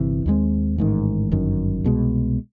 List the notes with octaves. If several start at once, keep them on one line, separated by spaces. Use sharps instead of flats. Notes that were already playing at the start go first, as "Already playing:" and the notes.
Already playing: G1 C3 E3
D#2 D#3 G#3 C4
A1 G#2 D#3
G1 F#2 D#3
C2 B2 G#3